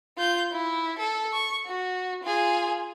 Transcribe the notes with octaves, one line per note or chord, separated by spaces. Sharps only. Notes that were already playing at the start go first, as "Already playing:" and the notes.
F4 G6
E4
A4
C#6
F#4
F4 G#4